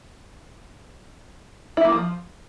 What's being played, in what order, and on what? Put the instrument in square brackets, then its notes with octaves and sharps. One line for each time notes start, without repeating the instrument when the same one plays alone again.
[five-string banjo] E4
A#3
F3